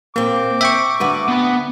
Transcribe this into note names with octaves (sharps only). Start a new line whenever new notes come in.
A#2 A#3 C4 D6
E5 G5 C#6
D2 F#4 B4
B3 B5